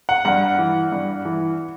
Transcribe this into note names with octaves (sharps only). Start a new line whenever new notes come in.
F#5
G2 F#5
E3
G2
E3